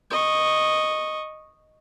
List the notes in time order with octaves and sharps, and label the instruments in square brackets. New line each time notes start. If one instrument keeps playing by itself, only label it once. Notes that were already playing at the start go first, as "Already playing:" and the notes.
[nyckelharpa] D#5 C#6